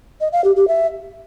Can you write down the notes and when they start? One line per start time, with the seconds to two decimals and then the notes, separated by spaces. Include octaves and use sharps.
0.21 D#5
0.33 F5
0.44 G4
0.56 G4
0.68 E5